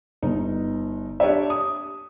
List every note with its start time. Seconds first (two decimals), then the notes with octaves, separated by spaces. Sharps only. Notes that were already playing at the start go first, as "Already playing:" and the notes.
0.22 G1 D#4
1.20 D4 G4 C#5 D5 E5
1.50 D#6